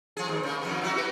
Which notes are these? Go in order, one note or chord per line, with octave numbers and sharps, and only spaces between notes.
F3 G#4
D#2 G#2
C#3 A#3
F2 D#3 B3
F#3 E4 F#4
F#4 G4 B4